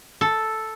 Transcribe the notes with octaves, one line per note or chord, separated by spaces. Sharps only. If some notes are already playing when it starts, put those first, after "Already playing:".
A4